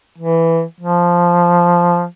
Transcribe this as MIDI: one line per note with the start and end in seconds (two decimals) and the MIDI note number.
0.18 0.63 52
0.80 2.05 53